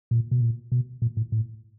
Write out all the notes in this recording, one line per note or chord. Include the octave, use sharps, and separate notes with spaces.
A#2
B2
A#2
B2
A#2
A2
A2